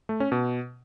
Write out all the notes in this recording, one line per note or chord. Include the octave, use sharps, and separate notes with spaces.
A3
C#4
B2